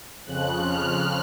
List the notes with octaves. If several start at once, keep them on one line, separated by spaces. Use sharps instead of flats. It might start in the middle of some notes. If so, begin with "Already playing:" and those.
F2 C#3 F3 F#6
F6